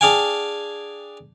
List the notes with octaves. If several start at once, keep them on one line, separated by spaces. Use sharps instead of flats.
D4 G#4 F5 G5 G#5